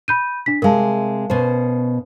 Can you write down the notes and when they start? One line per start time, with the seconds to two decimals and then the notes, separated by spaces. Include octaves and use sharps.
0.08 B5 G6 D#7
0.46 D4 B6
0.62 C3 G#3 A#4 F5 A5
1.30 B2 C#4 C5